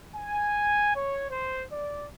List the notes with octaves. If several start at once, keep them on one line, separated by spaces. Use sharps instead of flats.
G#5
C#5
C5
D5